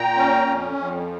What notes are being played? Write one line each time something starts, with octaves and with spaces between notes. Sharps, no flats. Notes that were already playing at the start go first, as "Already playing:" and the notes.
Already playing: A#2 G5 A#5
C#4
F2
F2